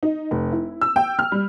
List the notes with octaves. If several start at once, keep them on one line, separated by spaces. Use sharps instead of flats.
D#4
F1
E4
E6
G5
F6
G3